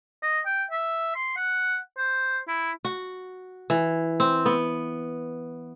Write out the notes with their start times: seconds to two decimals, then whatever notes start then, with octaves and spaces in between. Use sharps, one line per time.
0.22 D#5
0.46 G5
0.71 E5
1.16 C6
1.37 F#5
1.98 C5
2.48 E4
2.85 F#4
3.70 E3
4.20 C4
4.46 B3